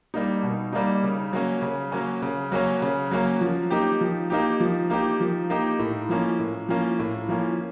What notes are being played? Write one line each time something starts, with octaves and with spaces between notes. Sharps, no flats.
G3 A#3 D#4
B2
G3 A#3 D#4
C#3
F#3 A#3 C#4
C#3
F#3 A#3 C#4
C#3
F#3 A#3 C#4
C#3
F#3 A#3 C#4
F3
A#3 D#4 G4
F3
A#3 D#4 G4
F3
A#3 D#4 G4
F3
A#3 D#4 G4
A2
F3 A#3 C#4
A2
F3 A#3 C#4
A2
F3 A#3 C#4